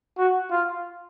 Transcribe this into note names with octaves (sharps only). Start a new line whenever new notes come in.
F#4
F4